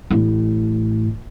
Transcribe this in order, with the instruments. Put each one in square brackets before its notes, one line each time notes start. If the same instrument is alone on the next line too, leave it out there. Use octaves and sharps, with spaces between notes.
[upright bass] A1 A2